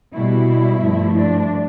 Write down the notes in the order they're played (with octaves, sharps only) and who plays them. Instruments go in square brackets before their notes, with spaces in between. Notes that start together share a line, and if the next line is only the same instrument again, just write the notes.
[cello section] B2 G3 E4
G2 F3 A3
D4